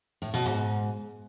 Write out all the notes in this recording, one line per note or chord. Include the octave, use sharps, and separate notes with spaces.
A2
B2
G#2